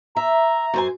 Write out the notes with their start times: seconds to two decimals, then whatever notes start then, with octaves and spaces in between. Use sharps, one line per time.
0.17 E5 A#5
0.74 F#2 C5 G#5